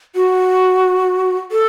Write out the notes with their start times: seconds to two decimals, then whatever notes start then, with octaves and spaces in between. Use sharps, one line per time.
0.16 F#4
1.52 A4